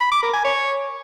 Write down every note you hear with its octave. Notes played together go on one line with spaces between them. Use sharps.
B5
D6
A#4
G#5
C#5